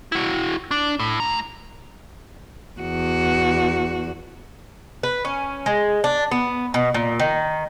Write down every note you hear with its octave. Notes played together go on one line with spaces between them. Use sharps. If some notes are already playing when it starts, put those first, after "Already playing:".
E4 F#4
D4
A2
A3 A#5
E2 F#4
B4
C#4
G#3
D4
B3
B2
A#2
D#3